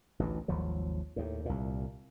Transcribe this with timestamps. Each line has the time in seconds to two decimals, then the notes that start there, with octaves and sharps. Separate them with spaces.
0.19 A1 D2 E3
0.48 G#1 D#2 F3 F#3
1.16 D#2 A2
1.45 C2 A#2